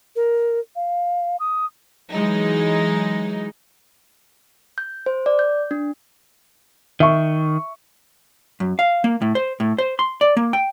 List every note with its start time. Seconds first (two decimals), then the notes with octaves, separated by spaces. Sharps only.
0.16 A#4
0.76 F5
1.40 D#6
2.12 E3 F#3 G#3 D#4
4.78 G6
5.06 C5
5.26 D5
5.39 G6
5.71 D4
7.00 D#3 E5 C#6
8.60 F#2
8.79 F5
9.04 A#3
9.22 A2
9.35 C5
9.60 A2
9.78 C5
9.99 C6
10.21 D5
10.37 A#3
10.53 G5